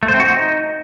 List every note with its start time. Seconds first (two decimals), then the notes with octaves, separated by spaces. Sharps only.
0.03 A3
0.08 C5
0.14 C4
0.20 F#4
0.25 D#4